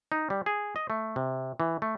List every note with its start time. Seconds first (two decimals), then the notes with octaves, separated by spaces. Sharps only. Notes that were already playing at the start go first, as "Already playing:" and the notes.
0.12 D#4
0.30 G3
0.46 G#4
0.76 D#5
0.90 A3
1.16 C3
1.60 E3
1.82 A3